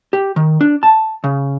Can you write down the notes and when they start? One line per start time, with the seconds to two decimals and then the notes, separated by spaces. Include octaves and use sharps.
0.13 G4
0.36 D#3
0.61 D4
0.83 A5
1.24 C#3